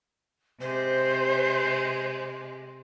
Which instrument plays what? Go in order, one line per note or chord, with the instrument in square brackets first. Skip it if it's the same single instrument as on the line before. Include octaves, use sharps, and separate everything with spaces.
[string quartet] C3 G#3 [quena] C5